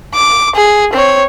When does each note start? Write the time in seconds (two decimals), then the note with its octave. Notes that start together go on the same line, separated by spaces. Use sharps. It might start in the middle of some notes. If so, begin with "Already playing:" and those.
0.14 D6
0.56 G#4
0.93 C4 C#5